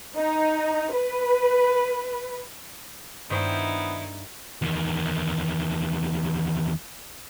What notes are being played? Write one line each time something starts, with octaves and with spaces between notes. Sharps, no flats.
D#4
B4
G2 D#3 A#3 B3 D#4 E4 C5 G5
E2 D#3